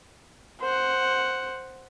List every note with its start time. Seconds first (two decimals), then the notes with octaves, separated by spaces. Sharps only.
0.61 C5 F#5